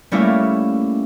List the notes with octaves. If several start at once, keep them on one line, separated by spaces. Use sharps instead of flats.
G3 A3 A#3 C#4 E4